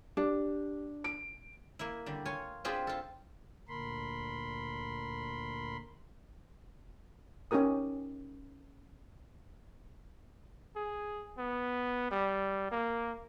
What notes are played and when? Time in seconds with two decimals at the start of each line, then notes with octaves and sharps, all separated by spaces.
0.17 D4 G4
1.04 D7
1.79 A#3 E4
2.06 D3 G3
2.25 F4 C#5 G#5
2.64 C4 D4 F4 G4 G#4 B4
2.87 F4 A4
3.68 D2 A#2 A#4 B5 C6
7.51 C#4 D#4 G4 A#4 D#6
10.76 G#4
11.38 B3
12.11 G3
12.71 A#3